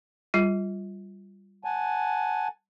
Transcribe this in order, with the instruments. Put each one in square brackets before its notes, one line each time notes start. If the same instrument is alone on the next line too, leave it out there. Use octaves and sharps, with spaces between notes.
[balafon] G3 F4
[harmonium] F#5 G#5 A5